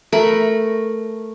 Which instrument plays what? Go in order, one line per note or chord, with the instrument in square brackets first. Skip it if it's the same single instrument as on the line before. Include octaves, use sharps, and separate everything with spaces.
[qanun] A3 A#4 B5